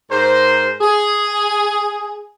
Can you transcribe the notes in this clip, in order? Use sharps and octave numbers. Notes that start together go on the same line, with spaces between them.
G#2 A#4 C5
G#4